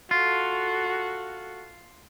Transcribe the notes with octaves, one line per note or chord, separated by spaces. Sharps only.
F4 F#4 A4